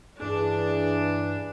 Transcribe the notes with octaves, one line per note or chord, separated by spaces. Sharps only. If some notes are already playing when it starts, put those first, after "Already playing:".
G2 E3 D4 G#4